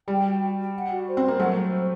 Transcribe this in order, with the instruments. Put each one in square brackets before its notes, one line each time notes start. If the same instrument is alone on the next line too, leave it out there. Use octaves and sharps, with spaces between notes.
[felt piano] G3 [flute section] G5
[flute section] F#4
G5
G5
F#5
F#4
C5
[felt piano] C4
[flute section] C5
[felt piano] A#3
[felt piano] F#3 A3 [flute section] F#5
[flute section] C5
C5